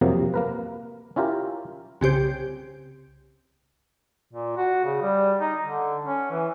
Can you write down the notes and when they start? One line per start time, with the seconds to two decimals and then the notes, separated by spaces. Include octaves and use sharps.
0.01 F2 C3 F3 F#3 A#3
0.34 A#3 A#4 B4
1.16 C#4 E4 F4 G4 A#4
2.01 C2 C#3 G4 C5
4.33 A#2
4.56 F#4
4.85 C#3
5.02 G3
5.39 D#4
5.63 D3
6.05 C#4
6.31 E3